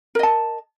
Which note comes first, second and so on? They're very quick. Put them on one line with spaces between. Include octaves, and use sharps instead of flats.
A#4 D#5 A5